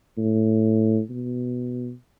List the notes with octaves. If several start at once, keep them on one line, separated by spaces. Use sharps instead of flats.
A2
B2